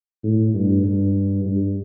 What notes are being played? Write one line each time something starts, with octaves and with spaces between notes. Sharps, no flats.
A2
G2
G2
G2